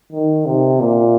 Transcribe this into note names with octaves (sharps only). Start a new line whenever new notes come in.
D#3
C3
A#2